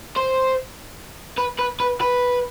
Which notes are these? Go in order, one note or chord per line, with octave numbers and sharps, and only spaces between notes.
C5
B4
B4
B4
B4